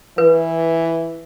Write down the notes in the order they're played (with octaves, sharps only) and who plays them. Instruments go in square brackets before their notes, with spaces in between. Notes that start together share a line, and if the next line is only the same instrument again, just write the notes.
[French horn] E3 [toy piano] B4